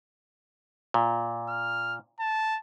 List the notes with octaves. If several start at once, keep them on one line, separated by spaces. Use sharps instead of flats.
A#2
F6
A5